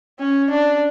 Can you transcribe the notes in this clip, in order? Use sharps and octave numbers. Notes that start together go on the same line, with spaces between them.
C#4
D4